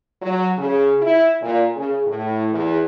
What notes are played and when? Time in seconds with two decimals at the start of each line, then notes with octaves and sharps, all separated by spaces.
0.22 F#3
0.58 C#3
1.01 E4
1.42 A#2
1.75 C#3
2.06 A2
2.52 E2